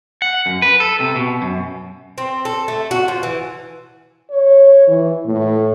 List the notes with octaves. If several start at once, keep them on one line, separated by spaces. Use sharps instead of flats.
F#5
F#2
B4
A4
C3
B2
F#2
C4
A4
A3
F#4
F3
E3
C#5
E3
A2